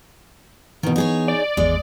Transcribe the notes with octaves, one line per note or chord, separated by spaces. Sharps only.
B2 D#3 E3 B3
D#4 G#4 C#5
D5
G#1 E2 G#3